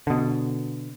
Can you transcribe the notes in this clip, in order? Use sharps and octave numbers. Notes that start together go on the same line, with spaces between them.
B2 D3